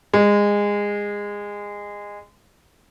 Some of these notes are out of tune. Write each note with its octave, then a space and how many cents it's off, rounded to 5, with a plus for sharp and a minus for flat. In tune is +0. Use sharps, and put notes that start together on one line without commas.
G#3 -20